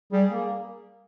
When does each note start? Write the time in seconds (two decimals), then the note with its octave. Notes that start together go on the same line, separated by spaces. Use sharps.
0.12 G3 G#4
0.30 A#3